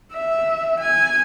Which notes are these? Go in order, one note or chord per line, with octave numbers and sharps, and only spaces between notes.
E5
G#5